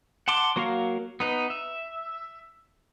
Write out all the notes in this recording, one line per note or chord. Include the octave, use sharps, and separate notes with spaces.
F#5 A5 C6 D6
F#3 A#3 F#4 A#4 F5
B3 D#4 B4
E5